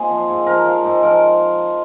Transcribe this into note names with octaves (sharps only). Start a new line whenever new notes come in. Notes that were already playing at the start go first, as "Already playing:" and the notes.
Already playing: A#2 C4 D#4 F4 G#4
F3
G#2
F3 A#4
F3
G#2
F3 A#4